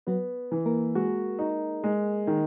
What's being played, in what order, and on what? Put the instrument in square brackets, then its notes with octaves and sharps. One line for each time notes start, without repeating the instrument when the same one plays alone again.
[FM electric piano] F#3 F#4 [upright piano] B3
[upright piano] E3
[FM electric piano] A#3 A#4
[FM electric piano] G#3 G#4 [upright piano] F#4
[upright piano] D#4
G#3
D#3